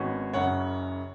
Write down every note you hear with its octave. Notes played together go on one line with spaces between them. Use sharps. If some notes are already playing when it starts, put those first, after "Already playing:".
Already playing: G#1 G#2 D#3 B3 C#4 F#4
F#1 F#2 C#3 C#5 F#5